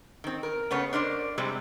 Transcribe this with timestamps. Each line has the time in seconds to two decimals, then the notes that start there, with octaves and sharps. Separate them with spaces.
0.24 D#3 C4
0.43 A#4
0.71 C#3 A3 B3 C#5
0.93 D4 A#4 C5 D5
1.38 C3 G3 G#3 C4